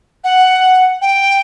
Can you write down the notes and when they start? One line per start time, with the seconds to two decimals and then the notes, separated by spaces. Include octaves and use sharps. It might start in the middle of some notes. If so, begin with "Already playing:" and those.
0.24 F#5
1.01 G5